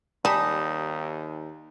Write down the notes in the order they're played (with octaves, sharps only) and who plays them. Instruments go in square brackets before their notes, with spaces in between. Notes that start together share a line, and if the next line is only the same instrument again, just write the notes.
[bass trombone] D#2 [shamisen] G3 [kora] D#4 [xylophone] G#5 A5 B6